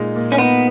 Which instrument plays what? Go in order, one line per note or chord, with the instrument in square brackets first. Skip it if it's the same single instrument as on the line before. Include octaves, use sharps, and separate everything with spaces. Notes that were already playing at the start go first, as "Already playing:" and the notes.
Already playing: [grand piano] A#2 G#3 D#4
A#2
[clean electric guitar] C#4
[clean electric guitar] B3 [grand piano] D#4